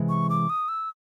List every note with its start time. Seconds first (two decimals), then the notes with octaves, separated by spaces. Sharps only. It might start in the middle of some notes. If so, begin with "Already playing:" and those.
Already playing: C3 E3 G#3
0.09 C#6
0.30 D6
0.50 D#6
0.68 E6